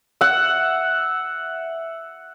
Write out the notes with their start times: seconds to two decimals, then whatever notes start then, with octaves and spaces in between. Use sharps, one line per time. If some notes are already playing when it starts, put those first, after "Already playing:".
0.21 E5 F#5